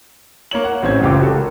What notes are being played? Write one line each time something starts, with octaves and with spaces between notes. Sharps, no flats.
A#3 C#5 F#7
F#5
A1 C4 C#4 G#6
F#1 C#2 F4 G4 D6
F#4 A4
A#4